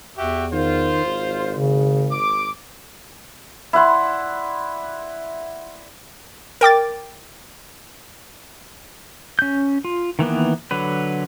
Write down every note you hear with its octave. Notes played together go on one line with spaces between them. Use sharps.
E2 F#4 G4 E5
D#3 F4 C5
G#1
C#3
D6
E4 D5 F#5 C6
A#4 G5 D6 A6
C#4 G6
F4
D#3 E3 A#3 B3
D3 F#3 B4